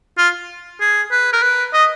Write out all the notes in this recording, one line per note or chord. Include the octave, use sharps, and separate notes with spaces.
F4
G#4
B4
A#4
B4
D#5